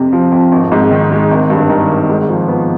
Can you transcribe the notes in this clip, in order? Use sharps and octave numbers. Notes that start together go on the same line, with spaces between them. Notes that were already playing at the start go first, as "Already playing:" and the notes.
Already playing: F2 C3
F3
F2
G#1
G#2
D#3
G#3
G#1
G2
D#3
G#1
G#2
F3
B3